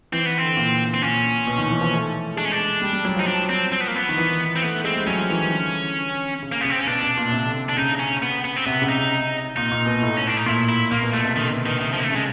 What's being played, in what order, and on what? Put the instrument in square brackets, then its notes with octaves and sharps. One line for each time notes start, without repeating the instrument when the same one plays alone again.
[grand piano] E3 [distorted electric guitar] C4
[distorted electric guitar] B3
[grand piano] D3 [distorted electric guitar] C4
[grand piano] A#2
[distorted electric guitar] C4
[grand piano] A#2 [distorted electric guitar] C#4
[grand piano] B2
D#3
E3
F3
A3
[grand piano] G#3 [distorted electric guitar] D4
[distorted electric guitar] C#4
D4
[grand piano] G3
G3
F#3
[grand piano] F3 [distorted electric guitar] D#4
[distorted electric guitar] D4
C4
C4
B3
A#3
B3
[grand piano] D#3
E3
[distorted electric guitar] C4
[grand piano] A3 [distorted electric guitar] B3
[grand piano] A3
[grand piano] G#3 [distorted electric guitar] C4
[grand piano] G3
[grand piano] F#3 [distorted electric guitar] C#4
[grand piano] F3
E3
D#3
D3
C#3
[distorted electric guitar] A#3
[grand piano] C#3 [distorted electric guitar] B3
[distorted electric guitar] C4
C#4
[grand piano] B2 [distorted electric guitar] D4
[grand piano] B2
A#2
C3
D3
[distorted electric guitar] D4
[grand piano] C#3 [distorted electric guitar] D#4
[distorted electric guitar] C#4
B3
B3
C4
[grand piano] C3 [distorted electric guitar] B3
[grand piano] C#3
[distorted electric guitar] D#4
[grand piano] A#2 [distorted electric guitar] D#4
[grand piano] A#2
B2
A2
[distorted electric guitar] C#4
D4
D#4
[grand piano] A#2 [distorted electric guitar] E4
[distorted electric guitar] E4
[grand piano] A#2 [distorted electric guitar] A#3
[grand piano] B2
[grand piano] B2 [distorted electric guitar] A3
[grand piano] C3
[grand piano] D3 [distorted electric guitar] D#3
[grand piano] B2
[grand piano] B2 [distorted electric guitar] D#3
[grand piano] C3 [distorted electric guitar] D#3
[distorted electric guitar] F3
[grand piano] D3 [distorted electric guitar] A#3
[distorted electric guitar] A3
[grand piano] C#3 [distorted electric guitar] G#3